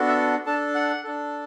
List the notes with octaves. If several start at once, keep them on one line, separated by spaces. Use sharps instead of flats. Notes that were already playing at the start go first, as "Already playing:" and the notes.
Already playing: B3 D4 F#4 A4
E5
D4 A4 A5
F#5
D4 A4